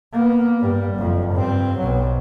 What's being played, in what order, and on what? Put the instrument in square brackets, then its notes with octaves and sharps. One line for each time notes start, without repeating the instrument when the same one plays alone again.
[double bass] A#3 B3
G2 G3
F#1 F2
G2 C4
B1 F#3